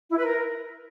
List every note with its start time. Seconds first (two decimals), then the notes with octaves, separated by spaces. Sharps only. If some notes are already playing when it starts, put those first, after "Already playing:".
0.10 E4
0.17 B4
0.24 A#4